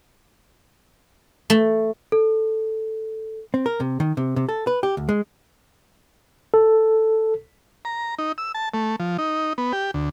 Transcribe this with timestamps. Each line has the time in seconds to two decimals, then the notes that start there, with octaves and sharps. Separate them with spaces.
1.50 A3
2.12 A4
3.54 C4
3.66 A#4
3.80 C3
4.00 D#3
4.17 C3
4.36 C3
4.49 A4
4.67 B4
4.83 G4
4.97 D2
5.09 G#3
6.54 A4
7.85 A#5
8.18 D#4
8.38 E6
8.54 A5
8.74 A3
9.00 F3
9.18 D#4
9.58 B3
9.73 G4
9.94 D2